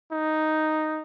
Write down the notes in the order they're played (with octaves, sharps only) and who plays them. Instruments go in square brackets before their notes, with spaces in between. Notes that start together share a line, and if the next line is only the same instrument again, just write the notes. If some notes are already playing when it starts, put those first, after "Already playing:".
[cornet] D#4